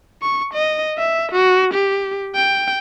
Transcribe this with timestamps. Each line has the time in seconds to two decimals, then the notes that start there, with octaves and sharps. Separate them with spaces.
0.22 C#6
0.54 D#5
0.98 E5
1.32 F#4
1.74 G4
2.35 G5